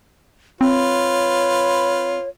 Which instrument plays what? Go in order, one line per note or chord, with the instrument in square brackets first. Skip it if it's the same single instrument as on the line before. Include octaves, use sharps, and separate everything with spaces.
[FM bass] C4 [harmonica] F4 B4 [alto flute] C#5